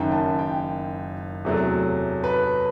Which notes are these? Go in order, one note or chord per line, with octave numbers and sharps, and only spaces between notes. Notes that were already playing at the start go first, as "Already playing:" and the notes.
Already playing: F#1 F#2 D#3 G5
A5
G5
E2 C3 F#3 A3
B4